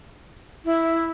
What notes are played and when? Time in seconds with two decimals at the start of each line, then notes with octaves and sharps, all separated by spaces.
0.65 E4